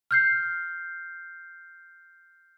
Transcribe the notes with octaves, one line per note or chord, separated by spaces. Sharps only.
F6 G6 C7